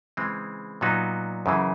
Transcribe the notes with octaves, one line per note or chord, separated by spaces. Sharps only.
C#3 E3 G#3 C4
A#2 F#3 B3 D#4 F#4
F#2 C#3 E3